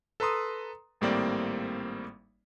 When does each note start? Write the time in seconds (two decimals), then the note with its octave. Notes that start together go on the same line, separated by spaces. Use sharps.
0.20 A4 B4 A#5 C6 D#6
1.01 G#1 A2 G3 A#3 C4 D5